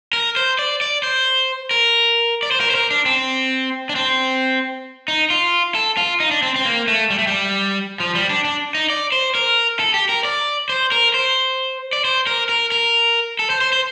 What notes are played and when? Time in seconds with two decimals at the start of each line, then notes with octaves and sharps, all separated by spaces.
0.13 A#4
0.36 C5
0.59 D5
0.81 D5
1.03 C5
1.71 A#4
2.43 D5
2.51 C5
2.61 A#4
2.70 C5
2.75 A#4
2.91 D4
3.06 C4
3.89 D4
3.95 C4
5.08 D#4
5.30 F4
5.75 A4
5.97 F4
6.20 D#4
6.31 D4
6.43 C4
6.56 C4
6.65 A#3
6.88 A3
7.10 G3
7.19 A3
7.27 G3
8.00 F3
8.15 G3
8.30 D4
8.45 D4
8.75 D#4
8.90 D5
9.12 C5
9.35 A#4
9.79 A4
9.94 G4
10.09 A#4
10.25 D5
10.69 C5
10.92 A#4
11.14 C5
11.93 D5
12.05 C5
12.27 A#4
12.49 A#4
12.72 A#4
13.39 A4
13.50 C5
13.61 C5
13.73 C5